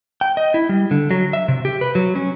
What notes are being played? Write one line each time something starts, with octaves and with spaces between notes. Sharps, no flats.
G5
D#5
E4
G3
D3
F#3
E5
C3
G4
B4
F#3
C#4